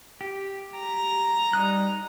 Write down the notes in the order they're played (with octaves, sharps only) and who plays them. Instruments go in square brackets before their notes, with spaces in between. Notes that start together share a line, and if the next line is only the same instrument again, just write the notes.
[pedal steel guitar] G4
[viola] A#5
[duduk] G3 [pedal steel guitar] D#4 D#6 F#6